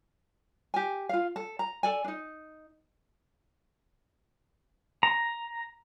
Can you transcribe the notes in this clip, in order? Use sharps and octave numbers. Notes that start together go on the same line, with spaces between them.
G4 G#5
F4 F5
A4
A#5
A4 D5 G#5
D4 D#4
A#5